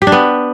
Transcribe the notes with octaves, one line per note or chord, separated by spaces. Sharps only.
G4
D4
B3